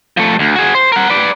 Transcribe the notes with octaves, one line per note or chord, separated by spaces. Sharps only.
F3 A3
D2
F#4 G#4
C5
A#4 F#5
B4 D5